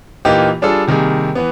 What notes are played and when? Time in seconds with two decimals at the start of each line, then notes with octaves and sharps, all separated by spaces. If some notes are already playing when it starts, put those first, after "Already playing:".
0.25 A#2 E3 A#3 D#4 F4 G4
0.62 G3 D4 F4 G#4 A4
0.87 C3 D#3 G3 A#3 G#4
1.35 E3 B3